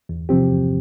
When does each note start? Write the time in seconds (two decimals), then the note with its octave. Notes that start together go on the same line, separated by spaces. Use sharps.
0.09 E2
0.29 C3 F3 C4 G4
0.50 E2